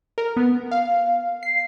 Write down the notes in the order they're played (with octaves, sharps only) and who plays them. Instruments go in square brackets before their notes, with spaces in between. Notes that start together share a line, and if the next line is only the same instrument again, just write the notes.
[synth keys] A#4
B3
F5
C7